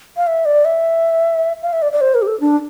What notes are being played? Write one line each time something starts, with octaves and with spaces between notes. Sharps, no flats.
F5
E5
D5
E5
F5
E5
D5
D5
C5
A#4
G4
A4
D4